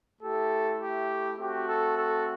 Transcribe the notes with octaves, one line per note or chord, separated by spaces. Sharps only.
A3 E4 G4 A4
G4
A3 C4 F#4 G4
A4
A4